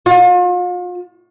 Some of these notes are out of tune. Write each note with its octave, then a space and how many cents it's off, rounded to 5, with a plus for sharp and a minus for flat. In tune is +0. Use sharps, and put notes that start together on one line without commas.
F4 +40